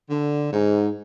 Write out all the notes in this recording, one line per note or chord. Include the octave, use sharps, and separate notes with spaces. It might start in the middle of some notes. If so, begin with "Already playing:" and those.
D3
G#2